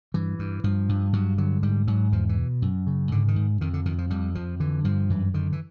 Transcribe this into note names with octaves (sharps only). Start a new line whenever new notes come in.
G2 E3
G2
G2 F3
G2
G2 F#3
D3 F#3
G#2 G3
G#2 F#3
E2 F3
E3
B2
F#2
C#3
G#2 D3
D#3
G#2
F2 D#3
D3
F2 D#3
F3
F2 G3
F2 F3
D3 E3
G2 F3
F#2 E3
D3 D#3
E3